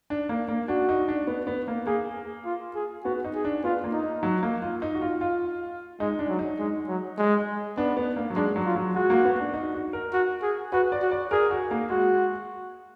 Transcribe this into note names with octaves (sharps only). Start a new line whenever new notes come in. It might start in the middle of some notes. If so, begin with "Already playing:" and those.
D4
A#3
A#3
D4 F#4
D#4
D4
B3
B3
A#3
A#3 G#4
F4
G#4
B3 F#4
D#4
G#4
D4
B3 F4
A#3
D#4
F#3
A#3
F4
D#4
F#4
F4
F4
G#3 D#4
D4
F#3
D#4
G#3
F#3
G#3
B3 D4
B3
A#3
F#3
G#3 D4
F#3
F4
F#3
G#3 F#4
A#3
B3
D4
D#4
F#4
A#4
F#4
G#4
F#4 B4
D5
F#4
D5
G#4 A#4
F#4
A#3
G#3 F#4